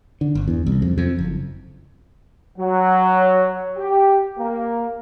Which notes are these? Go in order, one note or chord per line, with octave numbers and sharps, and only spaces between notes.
D3
G1
E2
C2
F2
F2
F#1
F#3
G4
A#3